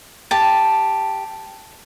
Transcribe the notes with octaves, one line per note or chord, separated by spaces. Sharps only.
G4 A5